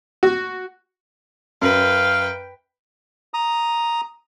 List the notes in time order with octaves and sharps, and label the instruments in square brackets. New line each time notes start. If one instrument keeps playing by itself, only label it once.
[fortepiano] F#4
[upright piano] F#2 [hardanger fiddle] B4 G5 [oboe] F5
[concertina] A#5 D#6